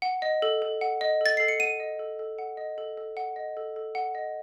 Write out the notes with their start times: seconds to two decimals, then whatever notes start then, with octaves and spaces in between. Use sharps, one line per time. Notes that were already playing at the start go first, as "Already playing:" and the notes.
0.02 F#5
0.22 D#5
0.42 A4
0.62 A4
0.81 F#5
1.01 D#5
1.21 A4 A6
1.37 A4 C7
1.48 C#7
1.59 F#5 D#7
1.80 D#5
1.99 A4
2.19 A4
2.39 F#5
2.57 D#5
2.78 A4
2.97 A4
3.17 F#5
3.36 D#5
3.57 A4
3.76 A4
3.95 F#5
4.15 D#5